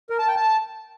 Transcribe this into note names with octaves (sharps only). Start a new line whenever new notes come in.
A#4
A5
G5
A5